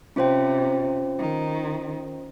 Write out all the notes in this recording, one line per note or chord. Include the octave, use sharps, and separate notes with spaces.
C3 C#4 F4 C5 G5
D#3